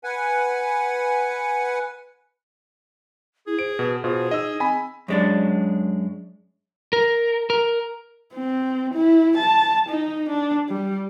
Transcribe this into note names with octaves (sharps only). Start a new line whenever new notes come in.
B4 F#5 G#5
E4 G#4
C5 D7
B2 B4
B2 F4 G#4 C5
D#4 D#5 E6
C4 G#5 B5
F#2 G#3 D4
A#4
A#4
C4
E4
A5
D#4
D4
G3